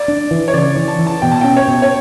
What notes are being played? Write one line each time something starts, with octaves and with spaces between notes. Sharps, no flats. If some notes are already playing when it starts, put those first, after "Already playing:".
Already playing: D5
D4
E3
C#5
C#3 D5
E3
A5
E3
A5
B2 G5
A5
C#4 G5
C#5
B2
C#5